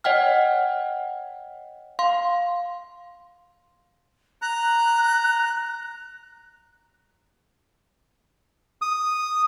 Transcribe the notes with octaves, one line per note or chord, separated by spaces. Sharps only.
C#5 D#5 F#5 G5 F6
F5 C6
A#5 F#6
D#6